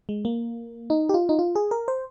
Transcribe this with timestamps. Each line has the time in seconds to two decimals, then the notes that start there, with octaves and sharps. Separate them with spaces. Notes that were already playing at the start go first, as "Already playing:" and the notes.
0.09 G#3
0.25 A#3
0.90 D#4
1.09 G4
1.14 F4
1.29 D#4
1.39 F4
1.55 G#4
1.71 A#4
1.88 C5